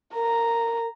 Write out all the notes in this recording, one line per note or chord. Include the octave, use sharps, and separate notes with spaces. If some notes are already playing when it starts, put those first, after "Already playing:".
A#4 A#5